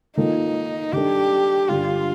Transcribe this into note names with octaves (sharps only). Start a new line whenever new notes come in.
D#3 A#3 D#4 F4 A4
D#3 G3 D4 G4 A4
G2 D3 G3 F4